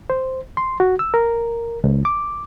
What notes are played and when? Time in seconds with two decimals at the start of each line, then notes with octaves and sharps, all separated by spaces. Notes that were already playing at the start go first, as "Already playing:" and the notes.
0.10 C5
0.57 C6
0.80 F#4
0.99 E6
1.14 A#4
1.84 C#2
2.05 D6